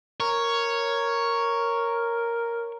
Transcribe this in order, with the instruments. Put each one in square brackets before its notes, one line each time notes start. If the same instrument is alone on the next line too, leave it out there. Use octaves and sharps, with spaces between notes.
[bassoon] A#4 [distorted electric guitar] C#5